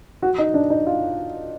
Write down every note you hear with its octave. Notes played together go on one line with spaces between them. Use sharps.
F#4
D#4
D4
D#4
F4